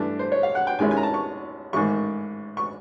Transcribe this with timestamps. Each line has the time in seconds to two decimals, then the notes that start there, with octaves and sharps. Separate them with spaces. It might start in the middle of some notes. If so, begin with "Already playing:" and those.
Already playing: G2 E3 A3 D4
0.19 C5
0.32 C#5
0.43 F5
0.55 F#5
0.67 G5
0.79 D#2 D#3 G#3 C#4 E4 G#5
0.91 G#5
0.97 A#5
1.03 A5
1.14 C#6
1.73 A1 G#2 D#3 C#6
2.57 C#6